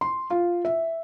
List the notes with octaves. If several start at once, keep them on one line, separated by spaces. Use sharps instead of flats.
C6
F4
E5